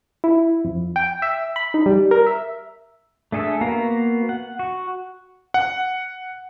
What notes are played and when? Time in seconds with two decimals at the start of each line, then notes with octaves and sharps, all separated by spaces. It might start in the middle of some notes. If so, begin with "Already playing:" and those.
0.24 E4
0.64 F2
0.96 G5
1.22 E5
1.56 B5
1.74 D#4
1.86 G3
2.11 A#4
2.26 E5
3.32 A3 D4 G#4 A4 E5
3.61 A#3 B3 F#4 F5 A#5
4.29 F#5
4.59 F#4
5.54 F#5